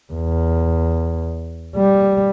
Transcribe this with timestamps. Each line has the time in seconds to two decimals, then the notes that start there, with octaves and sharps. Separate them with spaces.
0.13 E2
1.77 G3